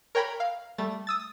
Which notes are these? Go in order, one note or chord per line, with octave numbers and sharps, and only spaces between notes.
A#4 C#5 G5 A#5 B5
F5
G3 A3 A6
D#6 E6 A6